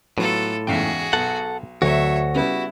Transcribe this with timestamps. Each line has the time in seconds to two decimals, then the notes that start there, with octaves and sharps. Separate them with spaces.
0.18 A2 F#3 B3 F4 A4
0.67 E2 G#2 C#3 F#4 G#4 E5 F5 G5
1.13 B1 A4 F#5
1.82 D2 F#3 F#4 C#5 E5
2.34 C#3 G3 B3 E4